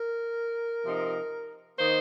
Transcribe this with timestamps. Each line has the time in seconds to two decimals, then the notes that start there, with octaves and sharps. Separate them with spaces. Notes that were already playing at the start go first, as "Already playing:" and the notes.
Already playing: A#4
0.85 C3 F3 C4 D#4
1.79 D#3 A#3 D#4 C5